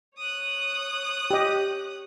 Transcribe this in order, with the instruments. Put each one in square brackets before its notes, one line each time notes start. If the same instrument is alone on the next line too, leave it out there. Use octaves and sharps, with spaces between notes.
[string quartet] C#5 D#6 F#6
[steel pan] G4 D#5